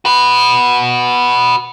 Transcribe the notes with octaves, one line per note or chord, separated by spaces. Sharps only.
F#4 B4